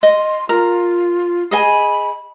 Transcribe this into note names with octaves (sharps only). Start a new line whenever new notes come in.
D#5 C6
F4 A#4
G#4 D#5 G#5 B5